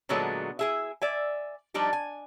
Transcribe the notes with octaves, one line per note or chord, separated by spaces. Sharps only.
A#2 D3 F#3 G#3 A3 B3
E4 G#4 E5
D5 E5 G#5
F3 G3 D4 D#4 G4
G#5